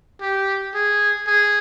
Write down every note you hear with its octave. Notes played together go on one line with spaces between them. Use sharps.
G4
G#4
G#4